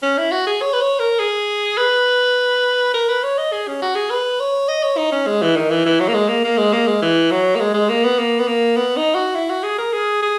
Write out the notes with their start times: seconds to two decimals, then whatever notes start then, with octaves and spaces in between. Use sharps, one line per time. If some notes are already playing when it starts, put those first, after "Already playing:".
0.03 C#4
0.18 E4
0.31 F#4
0.47 G#4
0.62 C#5
0.73 B4
0.81 C#5
0.99 A#4
1.19 G#4
1.78 B4
2.94 A#4
3.08 B4
3.23 C#5
3.38 D#5
3.52 G#4
3.67 C#4
3.82 F#4
3.95 G#4
4.10 B4
4.40 C#5
4.68 D#5
4.83 C#5
4.97 D#4
5.12 C#4
5.27 G#3
5.42 E3
5.56 D#3
5.71 E3
5.86 E3
6.00 F#3
6.08 A#3
6.14 G#3
6.28 A#3
6.44 A#3
6.58 G#3
6.73 A#3
6.87 G#3
7.02 E3
7.31 F#3
7.55 A#3
7.60 G#3
7.74 G#3
7.89 A#3
8.04 B3
8.19 A#3
8.39 B3
8.47 A#3
8.77 B3
8.96 D#4
9.15 F#4
9.35 E4
9.49 F#4
9.63 G#4
9.78 A#4
9.93 G#4
10.22 G#4